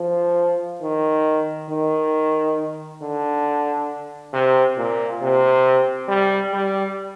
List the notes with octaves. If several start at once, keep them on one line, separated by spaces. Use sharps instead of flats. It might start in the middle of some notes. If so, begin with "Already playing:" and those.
Already playing: F3
D#3
D#3
D3
C3
A#2
C3
G3
G3